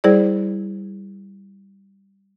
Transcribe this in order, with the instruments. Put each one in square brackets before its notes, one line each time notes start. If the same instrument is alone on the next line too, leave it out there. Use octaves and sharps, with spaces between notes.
[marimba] G3 E4 G#4 C5 D5